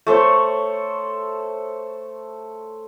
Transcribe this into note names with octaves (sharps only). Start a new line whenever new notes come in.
A3 A4 C5 C#5